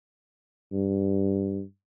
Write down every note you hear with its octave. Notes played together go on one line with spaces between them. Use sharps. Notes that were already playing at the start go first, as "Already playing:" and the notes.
G2